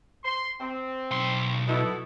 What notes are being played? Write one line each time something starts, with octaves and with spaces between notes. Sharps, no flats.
C6
C4
B1 C6
B2 E4 A4